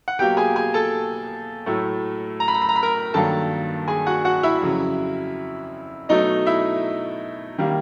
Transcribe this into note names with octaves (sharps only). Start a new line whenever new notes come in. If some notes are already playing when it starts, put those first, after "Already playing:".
F#5
B2 F#3 A#3 G4 G5
G#4 G#5
G#4 G#5
A4 A5
A2 F#3 A3
A#5
B5
A#5
B5
A#5
B5
A#4 A#5
G2 D#3 F#3 A#3 A4 A5
G#4 G#5
F#4 F#5
F#4 F#5
E4 E5
F2 C#3 F#3
B2 F#3 A3 D#4 D#5
E4 E5
D#3 G3 A#3